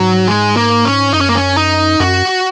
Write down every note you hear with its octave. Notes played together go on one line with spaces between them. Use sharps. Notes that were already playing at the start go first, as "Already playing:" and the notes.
Already playing: G#2 F#3
G#3
A#3
C#4
F#2 D#4
C#4
A#3
C#4
D#4
F#2 F#4